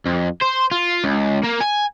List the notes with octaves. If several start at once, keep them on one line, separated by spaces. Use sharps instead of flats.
F2
C5
F4
C#2
A#3
G#5